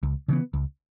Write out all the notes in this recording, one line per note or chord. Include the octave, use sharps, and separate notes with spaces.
C#2
C#3 E3 B3
C#2